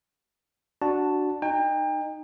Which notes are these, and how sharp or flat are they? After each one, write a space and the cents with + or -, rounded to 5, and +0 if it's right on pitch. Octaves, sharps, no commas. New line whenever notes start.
D4 +5 F#4 +0 A5 +0
D#4 -20 G5 +35